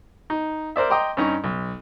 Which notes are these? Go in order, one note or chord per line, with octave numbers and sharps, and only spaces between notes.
D#4
A#4 C5 D5 E5
D#5 G5 A#5 C6 D6
G2 C#4 D#4 A#5 C#6
B1